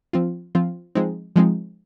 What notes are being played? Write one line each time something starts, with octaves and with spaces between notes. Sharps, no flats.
F3 C4 F4
F3 C4 F4
F3 G#3 C4 D#4
F3 G#3 C4 D#4